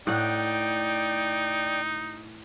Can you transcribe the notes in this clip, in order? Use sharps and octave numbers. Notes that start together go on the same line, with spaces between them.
A2 D#4 D5 F#5 G5